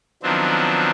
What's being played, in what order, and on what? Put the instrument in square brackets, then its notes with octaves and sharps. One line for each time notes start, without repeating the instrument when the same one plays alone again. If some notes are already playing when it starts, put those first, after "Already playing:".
[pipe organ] D#3 F3 F#3 B3 C4 D4